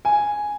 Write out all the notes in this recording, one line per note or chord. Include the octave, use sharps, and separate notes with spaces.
G#5